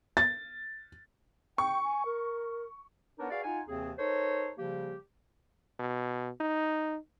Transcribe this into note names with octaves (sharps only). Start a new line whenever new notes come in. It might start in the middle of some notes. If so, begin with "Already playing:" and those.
A6
G5 C#6
G#5
A#4
B3 D4 D#4 A#4 B4 C#5
F#4 G#4 B4 D5 F5
D#4 F4 F#5 G#5
D#2 C3 E3 C4 G#4
D#4 A4 A#4 C5 C#5
C#3 F3 G3 A#3 G4
B2
D#4